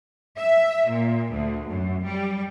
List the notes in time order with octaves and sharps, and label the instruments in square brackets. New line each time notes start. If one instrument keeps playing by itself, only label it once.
[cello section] E5
A#2
D2
F#2
G3